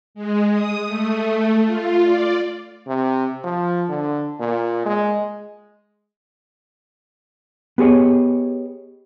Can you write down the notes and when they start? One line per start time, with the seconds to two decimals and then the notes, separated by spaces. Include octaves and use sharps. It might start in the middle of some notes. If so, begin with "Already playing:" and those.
0.15 G#3
0.51 D#6
0.86 A3
1.65 F4
2.03 D5
2.87 C3
3.44 F3
3.89 D3
4.40 A#2
4.86 G#3
7.78 B3 G4 G#4 C#5 D#5